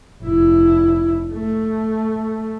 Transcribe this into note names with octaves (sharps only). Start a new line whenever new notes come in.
F1 E4
A3